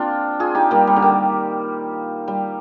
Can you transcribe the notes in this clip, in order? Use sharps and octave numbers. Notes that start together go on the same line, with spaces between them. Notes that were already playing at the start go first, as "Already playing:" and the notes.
Already playing: A#3 C4 D4 F4
F4 G#4
D#4 G4
G3 A#3
G3
D3
D#3
G3